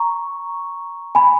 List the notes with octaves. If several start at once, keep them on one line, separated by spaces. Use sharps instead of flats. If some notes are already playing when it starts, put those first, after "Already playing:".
Already playing: A#5 C#6
G#5 B5